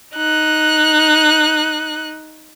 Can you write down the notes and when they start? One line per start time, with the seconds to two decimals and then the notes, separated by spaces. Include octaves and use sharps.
0.16 D#4 F#6